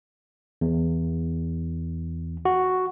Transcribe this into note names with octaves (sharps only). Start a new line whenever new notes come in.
E2
F#4